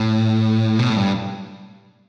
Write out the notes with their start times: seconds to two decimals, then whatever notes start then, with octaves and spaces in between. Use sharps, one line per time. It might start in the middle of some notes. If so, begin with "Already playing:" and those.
Already playing: A2
0.79 B2
0.90 A2
0.96 G2